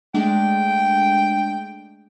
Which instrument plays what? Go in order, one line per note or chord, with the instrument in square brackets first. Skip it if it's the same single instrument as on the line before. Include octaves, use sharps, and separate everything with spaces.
[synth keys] G#3 A3 D4 [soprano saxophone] G5